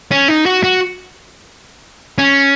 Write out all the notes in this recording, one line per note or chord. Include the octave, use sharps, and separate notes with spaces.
C#4
D#4
F#4
F#4
C#4